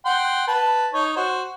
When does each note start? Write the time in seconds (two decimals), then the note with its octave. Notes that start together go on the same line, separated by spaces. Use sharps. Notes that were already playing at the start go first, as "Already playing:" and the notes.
0.06 F#5 G5 C6
0.48 B4 A5
0.93 D#4 C#5
1.16 F#4 C5